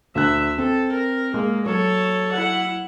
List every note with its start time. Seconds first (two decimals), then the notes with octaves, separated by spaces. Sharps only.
0.15 D2 E5 F#6
0.58 C4 A4
0.92 A#4
1.34 G#3 A#3
1.66 F#3 A4 C#5
2.32 E4 F#5